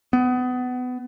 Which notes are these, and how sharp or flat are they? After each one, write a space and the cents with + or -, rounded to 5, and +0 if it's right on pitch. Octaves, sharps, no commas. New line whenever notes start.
B3 +25